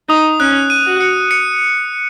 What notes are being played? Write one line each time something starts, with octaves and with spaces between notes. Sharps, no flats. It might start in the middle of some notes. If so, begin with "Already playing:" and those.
D#4 D#6
C#4 F#6
D#7
F#4
C#7
C#7